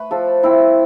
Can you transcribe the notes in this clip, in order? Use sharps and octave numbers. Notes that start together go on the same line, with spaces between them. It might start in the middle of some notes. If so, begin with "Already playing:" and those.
Already playing: A3 B4
F3 A4
C4 E4